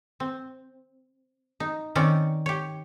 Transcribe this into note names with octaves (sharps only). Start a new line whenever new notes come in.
C4
D#4
D#3 C4 C#4 A#4 C#5 D5
G4 C#5